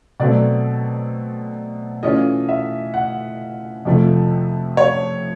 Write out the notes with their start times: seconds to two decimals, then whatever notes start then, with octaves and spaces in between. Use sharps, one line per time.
0.20 B2 F#3 A3 C4 D5
2.03 E3 A3 C#4 F4 D#5
2.49 E5
2.94 F#5
3.85 F2 C3 F3 A3
4.77 C#5